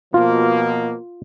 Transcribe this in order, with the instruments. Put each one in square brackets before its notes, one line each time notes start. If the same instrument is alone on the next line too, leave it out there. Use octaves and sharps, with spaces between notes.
[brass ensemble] B2 F3 A#3 [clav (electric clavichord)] F4